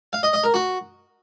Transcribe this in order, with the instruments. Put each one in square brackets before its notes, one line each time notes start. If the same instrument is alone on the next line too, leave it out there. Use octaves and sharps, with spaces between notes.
[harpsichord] F5
D#5
D#5
A#4
F#4